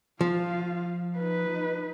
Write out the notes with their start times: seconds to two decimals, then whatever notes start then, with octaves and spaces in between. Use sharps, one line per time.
0.21 F3 F4 F5
1.18 D#4 B4